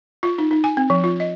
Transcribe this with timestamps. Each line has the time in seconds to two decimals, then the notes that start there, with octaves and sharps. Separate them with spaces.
0.23 F4
0.38 D#4
0.51 D#4
0.64 G#5
0.77 C4
0.90 F3
1.04 F4
1.20 D#5